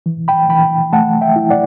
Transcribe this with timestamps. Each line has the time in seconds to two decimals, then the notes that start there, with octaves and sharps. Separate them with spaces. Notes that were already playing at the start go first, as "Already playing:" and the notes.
0.06 E3
0.28 G5 B5
0.49 E3 G5 B5
0.93 A3 F#5 A5
1.21 E5 G5
1.36 E4
1.50 D5 F#5